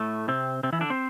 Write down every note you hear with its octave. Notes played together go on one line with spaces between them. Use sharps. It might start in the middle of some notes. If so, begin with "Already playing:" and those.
Already playing: A2 A3
C3 C4
C3 C4
E3 E4
D3 D4
C4 C5